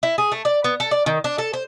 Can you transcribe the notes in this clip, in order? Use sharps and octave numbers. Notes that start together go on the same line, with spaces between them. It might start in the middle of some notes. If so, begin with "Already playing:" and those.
E4
G#4
A3
D5
B3
A4
D5
D#3
D4
A4
C5